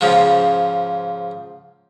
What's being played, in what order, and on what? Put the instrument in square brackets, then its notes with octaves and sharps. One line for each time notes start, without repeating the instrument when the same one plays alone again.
[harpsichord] G#2 C#3 F3